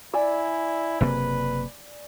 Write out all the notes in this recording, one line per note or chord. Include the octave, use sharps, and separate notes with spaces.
E4 D5 G#5 E6
F#1 C3 A#3 B4